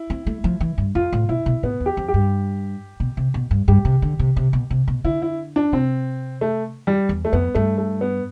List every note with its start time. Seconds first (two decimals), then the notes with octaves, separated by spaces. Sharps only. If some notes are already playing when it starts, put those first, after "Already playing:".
Already playing: E4
0.10 C4
0.27 A3
0.44 F3
0.60 E3
0.78 G2
0.95 F2 F4
1.13 A2
1.29 B2 E4
1.46 B2
1.63 A2 B3
1.80 E2
1.86 G4
1.97 F2
2.08 G4
2.14 G2
3.00 B2
3.17 C3
3.34 B2
3.51 G2
3.68 G2 G4
3.85 C3
4.02 D3
4.19 C3
4.36 C3
4.53 B2
4.70 C3
4.88 B2
5.04 D3 E4
5.22 E4
5.56 D4
5.72 C3 C4
6.41 A3
6.87 G3
7.09 E2
7.25 A3
7.33 F2 B3
7.55 G2 A3
7.78 A3
8.01 B3